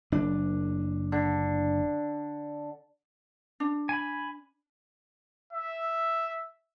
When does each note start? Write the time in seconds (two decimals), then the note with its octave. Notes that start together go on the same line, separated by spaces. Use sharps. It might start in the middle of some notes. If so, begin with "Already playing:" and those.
0.12 F#1 D4
1.12 D3
3.60 D4
3.89 G#5 B5
5.53 E5